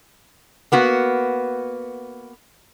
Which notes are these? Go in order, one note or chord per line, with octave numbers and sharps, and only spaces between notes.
A#3 B3 F#4